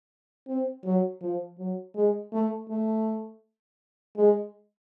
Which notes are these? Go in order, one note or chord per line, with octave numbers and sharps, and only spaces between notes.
C4
F#3
F3
F#3
G#3
A3
A3
G#3